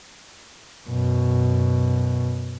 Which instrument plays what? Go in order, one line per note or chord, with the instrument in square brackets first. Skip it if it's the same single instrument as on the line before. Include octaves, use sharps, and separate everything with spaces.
[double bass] F#2 B2